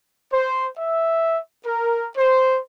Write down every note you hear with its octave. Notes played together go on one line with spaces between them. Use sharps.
C5
E5
A#4
C5